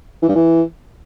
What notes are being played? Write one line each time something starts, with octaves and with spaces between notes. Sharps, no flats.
E3
G2
E3